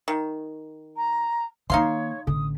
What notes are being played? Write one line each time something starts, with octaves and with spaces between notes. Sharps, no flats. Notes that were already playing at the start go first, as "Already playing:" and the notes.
D#3
A#5
D#3 A#3 D#4 C#5 F5 C6
A1 D3 D#6